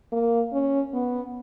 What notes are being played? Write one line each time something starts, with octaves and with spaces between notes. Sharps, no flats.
A#3
C#4
B3